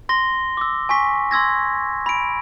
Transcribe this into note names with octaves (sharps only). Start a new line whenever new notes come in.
C6 A#6 G7
D6 E6
G#5 C#6 B6
C6 E6 G#6 A#6
B5 D7